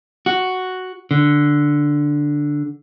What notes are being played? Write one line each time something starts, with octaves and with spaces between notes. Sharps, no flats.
F#4
D3